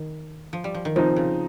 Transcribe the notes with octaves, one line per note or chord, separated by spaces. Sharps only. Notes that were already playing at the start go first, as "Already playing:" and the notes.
Already playing: D#3
F3
G3
F3
D#3
C3 F3 C4 D#4
C#3